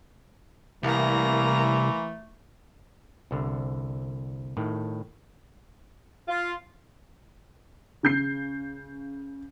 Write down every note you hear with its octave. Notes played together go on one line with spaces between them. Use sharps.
C2 E3 A3 A#3 A#5
C2 D3
A2 D#3
F4
C#3 G6 C7